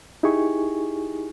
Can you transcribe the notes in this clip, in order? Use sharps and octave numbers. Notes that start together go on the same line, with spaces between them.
D#4 E4 G4 G#4 G#5 C#6